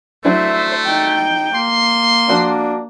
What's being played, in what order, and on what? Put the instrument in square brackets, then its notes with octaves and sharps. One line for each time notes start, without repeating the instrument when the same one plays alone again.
[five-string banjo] F#3 D4 E4 [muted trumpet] A3 [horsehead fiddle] C5 E5
[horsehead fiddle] D#4 G5
[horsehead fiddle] A#3 [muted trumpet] C6
[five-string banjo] F3 F#4 [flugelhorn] D4